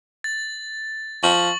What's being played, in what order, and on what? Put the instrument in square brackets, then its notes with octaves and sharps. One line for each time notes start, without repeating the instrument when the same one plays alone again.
[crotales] A6
[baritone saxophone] F3 [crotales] C#6 F#7